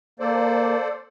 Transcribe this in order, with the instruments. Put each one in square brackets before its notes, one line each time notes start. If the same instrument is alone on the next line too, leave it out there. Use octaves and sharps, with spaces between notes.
[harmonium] A#3 [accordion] A4 C5 D5